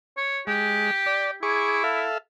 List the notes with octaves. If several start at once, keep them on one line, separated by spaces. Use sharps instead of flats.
C#5
G#3 G4
D5
E4 G#4 C#6 D6
A4 E5 F5